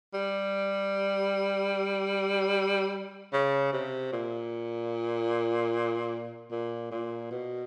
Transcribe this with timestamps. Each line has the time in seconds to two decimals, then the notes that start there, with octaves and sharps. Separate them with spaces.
0.14 G3
3.33 C#3
3.73 C3
4.13 A#2
6.51 A#2
6.91 A#2
7.31 B2